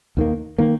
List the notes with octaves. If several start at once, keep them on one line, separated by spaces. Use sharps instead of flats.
D#2 D#3 A#3
D#3 A#3